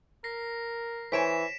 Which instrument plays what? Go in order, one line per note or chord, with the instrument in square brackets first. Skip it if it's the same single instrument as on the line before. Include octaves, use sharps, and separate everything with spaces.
[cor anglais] A#4 [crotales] A#6 C7
[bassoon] E3 [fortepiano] C5 C#5 G#5 [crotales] B6 D7 E7